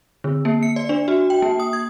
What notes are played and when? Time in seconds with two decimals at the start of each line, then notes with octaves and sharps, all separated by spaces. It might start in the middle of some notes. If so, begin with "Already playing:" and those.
0.24 D3
0.45 A#3
0.63 C#7
0.76 D5
0.89 D4
1.08 F#4
1.30 G5
1.42 A#3
1.60 D#6
1.73 G#6